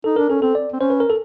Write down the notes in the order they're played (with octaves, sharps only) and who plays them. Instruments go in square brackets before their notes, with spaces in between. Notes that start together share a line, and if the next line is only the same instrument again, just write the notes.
[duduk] D#4 [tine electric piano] A4
[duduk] D4 [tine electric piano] A#4
[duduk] C#4 [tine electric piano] A4
[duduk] C4 [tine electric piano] A4
[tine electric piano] D5
[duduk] C4
[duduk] C#4 [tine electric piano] C5
[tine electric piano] B4
A#4
A4